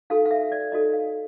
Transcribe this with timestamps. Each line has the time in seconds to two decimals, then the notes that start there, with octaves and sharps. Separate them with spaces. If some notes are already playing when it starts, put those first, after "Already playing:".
0.10 D#4 F#4 A4 F5
0.25 F5
0.31 E5
0.52 D5
0.72 D#4 F#4 A4 D#5
0.93 F5